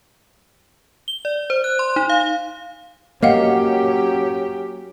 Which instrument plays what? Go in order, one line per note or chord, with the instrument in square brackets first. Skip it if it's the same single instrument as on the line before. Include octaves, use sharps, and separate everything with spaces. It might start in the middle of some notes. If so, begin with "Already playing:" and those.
[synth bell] G7
D5
C5
F#6
C6
D#4
F5
[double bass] F#3 C#4 [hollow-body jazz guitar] A#3 [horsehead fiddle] G4 [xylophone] D#5 F5 F#5